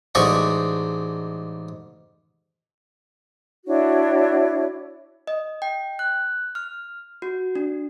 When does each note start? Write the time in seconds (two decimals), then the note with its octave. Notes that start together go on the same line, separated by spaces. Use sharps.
0.15 A1 G#2 G#3 D5 D#5 C#6
3.66 D4 E4 F#4 C#5
5.27 D#5
5.62 G5
5.99 F#6
6.55 F6
7.22 F#4
7.55 D4